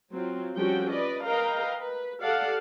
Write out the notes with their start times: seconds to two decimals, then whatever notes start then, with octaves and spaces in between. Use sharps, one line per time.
0.12 F#3 C4 F4
0.56 F3 G3 C#4 F#4 A4 G5
0.91 B4 D5 D#5
1.26 A#4 B4 D#5 F5 G5 A#5
1.82 B4
2.22 G4 A4 D5 F5 F#5 A5